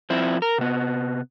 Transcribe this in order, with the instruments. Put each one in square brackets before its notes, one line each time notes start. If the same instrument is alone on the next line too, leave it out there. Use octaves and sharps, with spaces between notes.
[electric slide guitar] F3 C4 E4
A#4
C3 B3